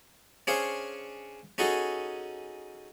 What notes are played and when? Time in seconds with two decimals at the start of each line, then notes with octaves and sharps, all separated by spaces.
0.47 C#4 D4 G#4 C5 C#5 F5
1.58 C#4 D#4 F#4 G#4 A4